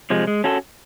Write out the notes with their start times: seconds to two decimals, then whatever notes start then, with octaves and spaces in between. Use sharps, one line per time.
0.10 C3 F3 G#3
0.27 G#3
0.44 C#4 F#4 A4